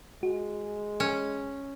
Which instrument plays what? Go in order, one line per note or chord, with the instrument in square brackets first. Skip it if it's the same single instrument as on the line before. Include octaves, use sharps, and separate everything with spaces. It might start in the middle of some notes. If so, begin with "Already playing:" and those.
[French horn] G#3 [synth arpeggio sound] F#4
[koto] C#4